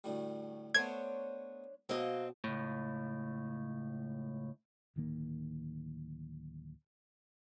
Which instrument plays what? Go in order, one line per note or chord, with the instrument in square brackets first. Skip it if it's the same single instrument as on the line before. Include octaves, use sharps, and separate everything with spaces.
[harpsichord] D2 A2 G3
[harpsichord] A3 B3 [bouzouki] D4 C5 C#5 [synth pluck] G#6
[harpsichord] B2 [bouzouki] F#3 G3 A#3 [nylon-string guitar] C4 D#5
[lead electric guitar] C#2 A2
[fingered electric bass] D1 D#3 A#3